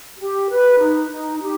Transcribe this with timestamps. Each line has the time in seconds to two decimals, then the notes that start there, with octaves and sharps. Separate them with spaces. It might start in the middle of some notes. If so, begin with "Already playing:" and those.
0.18 G4
0.49 B4
0.80 D#4
1.10 D#4
1.41 G4